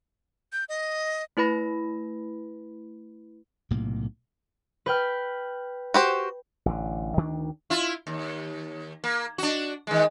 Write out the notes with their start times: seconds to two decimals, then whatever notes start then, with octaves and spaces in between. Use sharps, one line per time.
0.53 G6
0.69 D#5
1.37 A3 E4 B4 B5 A#6
3.71 B1 A2 C3 A#3
4.86 B4 G5 F6
5.94 F#4 G4 C5
6.66 A1 D3
7.17 D2 D#3 D4
7.70 E4 F4
8.07 D#2
9.04 A#3
9.38 D4 F#4
9.87 D#3 G#3